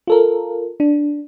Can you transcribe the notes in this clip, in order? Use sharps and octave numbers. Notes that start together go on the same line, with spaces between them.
F4 A4 A#4
D4